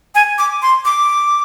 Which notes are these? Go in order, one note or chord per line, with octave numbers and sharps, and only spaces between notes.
G#5
D6
C6
D6